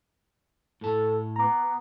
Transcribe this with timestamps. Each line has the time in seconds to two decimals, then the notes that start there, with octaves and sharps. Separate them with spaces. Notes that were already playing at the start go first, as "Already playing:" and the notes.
0.81 A2 A4 A5
1.36 B3 A#5 D6